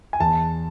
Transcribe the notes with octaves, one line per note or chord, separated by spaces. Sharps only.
G#5
E2 A5